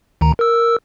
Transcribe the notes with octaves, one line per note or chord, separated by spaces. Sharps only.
D2 D#3 A#5
A#4 E6